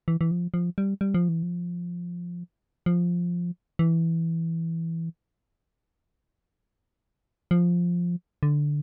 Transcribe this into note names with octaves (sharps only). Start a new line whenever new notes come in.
E3
E3
F3
F3
G3
G3
F3
E3
F3
F3
E3
F3
D3